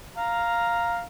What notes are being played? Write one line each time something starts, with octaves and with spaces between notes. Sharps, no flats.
F5 A#5